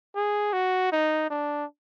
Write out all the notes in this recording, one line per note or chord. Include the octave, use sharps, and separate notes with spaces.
G#4
F#4
D#4
D4